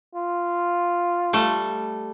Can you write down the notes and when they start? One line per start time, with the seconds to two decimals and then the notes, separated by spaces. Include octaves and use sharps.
0.15 F4
1.33 G3 A3